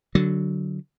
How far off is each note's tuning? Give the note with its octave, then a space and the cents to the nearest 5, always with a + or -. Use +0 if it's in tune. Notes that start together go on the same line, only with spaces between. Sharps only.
D3 +0 F#3 +10